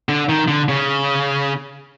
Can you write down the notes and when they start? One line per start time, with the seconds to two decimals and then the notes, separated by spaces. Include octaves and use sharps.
0.09 D3
0.29 D#3
0.48 D3
0.68 C#3